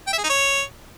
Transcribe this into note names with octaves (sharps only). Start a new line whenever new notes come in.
G5
E5
G#4
D#4
C#5